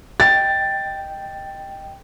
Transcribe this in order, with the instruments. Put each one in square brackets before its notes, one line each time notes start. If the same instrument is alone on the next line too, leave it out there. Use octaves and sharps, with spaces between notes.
[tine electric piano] D#5 G5 [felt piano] A6